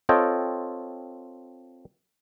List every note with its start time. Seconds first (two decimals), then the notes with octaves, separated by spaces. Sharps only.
0.09 C4 F4 A4 C#5 D#5 G5